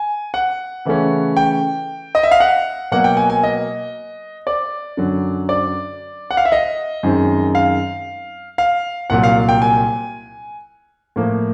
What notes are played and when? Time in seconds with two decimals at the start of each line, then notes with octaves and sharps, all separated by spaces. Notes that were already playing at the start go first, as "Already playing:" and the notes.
Already playing: G#5
0.34 F#5
0.85 C#3 E3 A3 C#4
1.37 G5
2.15 D#5
2.23 E5
2.31 F5
2.40 F#5
2.92 B2 F#3 A#3 F#5
3.04 G5
3.17 G#5
3.30 G#5
3.43 D#5
4.47 D5
4.97 F#2 D3 F#3
5.49 D5
6.31 F#5
6.37 F5
6.45 E5
6.52 D#5
7.03 F#2 D#3 G#3 C4
7.55 F5
8.58 F5
9.10 C2 A#2 F#3 F#5
9.23 F5
9.49 G5
9.62 G#5
11.16 A2 F3 A#3